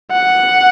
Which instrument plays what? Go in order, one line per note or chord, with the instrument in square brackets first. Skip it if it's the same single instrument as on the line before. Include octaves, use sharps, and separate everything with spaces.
[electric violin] F#5